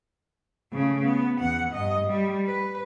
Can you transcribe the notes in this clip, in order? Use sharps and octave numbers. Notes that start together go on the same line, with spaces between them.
C#3 A3
B3
E2 F#5
G2 D#5
G3
B4